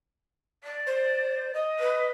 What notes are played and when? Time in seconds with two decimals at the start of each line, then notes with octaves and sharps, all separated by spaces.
0.63 D5
0.87 C5
1.54 D#5
1.78 B4